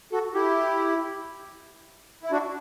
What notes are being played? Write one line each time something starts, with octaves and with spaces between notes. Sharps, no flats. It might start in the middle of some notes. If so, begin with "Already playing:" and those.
F#4 A4
E4 G4
E4
D4 F#4